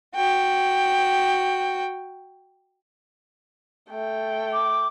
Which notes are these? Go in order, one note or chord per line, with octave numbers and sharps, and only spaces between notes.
F#4 G5
A3 G5
D6